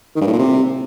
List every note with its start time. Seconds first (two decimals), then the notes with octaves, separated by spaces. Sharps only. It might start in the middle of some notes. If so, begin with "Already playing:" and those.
0.16 D#3
0.21 G2
0.27 A2
0.33 A#2
0.39 C3